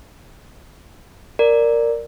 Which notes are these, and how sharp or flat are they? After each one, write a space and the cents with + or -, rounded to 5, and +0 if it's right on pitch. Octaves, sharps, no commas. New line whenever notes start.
A#4 -5 D5 +0